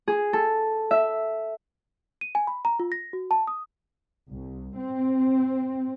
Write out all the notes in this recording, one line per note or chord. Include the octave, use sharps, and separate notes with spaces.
G#4
A4
E5
D#7
G#5
B5
A#5
F4
A#6
F#4
A5
D#6
C2
C4